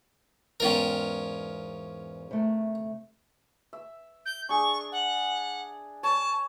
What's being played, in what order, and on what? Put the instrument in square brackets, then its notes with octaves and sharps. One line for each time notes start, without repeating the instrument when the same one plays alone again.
[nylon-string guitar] E2 G#2 G5 [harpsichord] C#4 F4 A#4
[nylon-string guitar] C3 A3
[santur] E5
[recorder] G6
[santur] D4 G#4 [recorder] C#6
[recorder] F#5
[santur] C#5 [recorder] A5